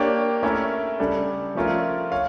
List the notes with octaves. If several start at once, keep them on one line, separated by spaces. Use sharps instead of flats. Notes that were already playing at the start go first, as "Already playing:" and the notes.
Already playing: A#3 D4 G4 C#5
A3 C#4 E4 A#4
C#3 G3 D4 A4
F3 A3 C#4 F4 A#4
C#5 F5